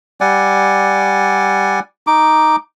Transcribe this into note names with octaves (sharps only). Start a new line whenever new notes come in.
G3 D5 F#5 G#5
D#4 D6